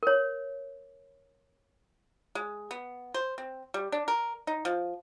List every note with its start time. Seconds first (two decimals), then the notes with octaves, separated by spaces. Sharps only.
0.03 A#4 C#5
2.35 G#3
2.71 B3
3.14 C5
3.38 C4
3.74 G3
3.92 D4
4.08 A#4
4.47 D#4
4.65 F3